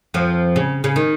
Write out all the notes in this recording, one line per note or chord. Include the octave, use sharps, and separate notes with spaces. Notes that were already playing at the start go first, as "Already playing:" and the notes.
F2 F3
C#3
C#3
D#3